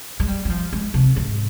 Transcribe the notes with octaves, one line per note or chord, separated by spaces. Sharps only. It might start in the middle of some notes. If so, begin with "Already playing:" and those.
G#3
G3
G3
F3
G#3
C3
G#2